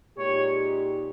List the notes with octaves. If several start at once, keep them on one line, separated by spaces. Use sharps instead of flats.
A#2 G#3 D#4 G4 C#5